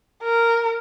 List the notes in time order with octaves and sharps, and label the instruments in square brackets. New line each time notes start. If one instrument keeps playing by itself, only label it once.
[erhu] A#4